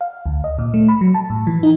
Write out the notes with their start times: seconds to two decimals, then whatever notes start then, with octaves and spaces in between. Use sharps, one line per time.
0.01 F5
0.26 D2
0.44 D#5
0.59 A#2
0.74 A3
0.88 B5
1.01 F#3
1.14 A5
1.30 A2
1.47 E3
1.63 D#4